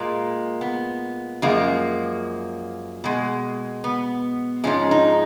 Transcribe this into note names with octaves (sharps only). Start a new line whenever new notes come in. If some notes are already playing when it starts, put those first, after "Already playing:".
Already playing: A#2 G#3 A#3
B3
F#2 F3 G#3 A#3
B2 G#3
B3
G#2 F3 G#3 C#4
D#4